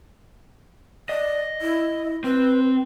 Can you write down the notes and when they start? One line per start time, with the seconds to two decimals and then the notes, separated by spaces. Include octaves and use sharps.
1.09 D5 D#5
1.61 E4
2.24 C4 B4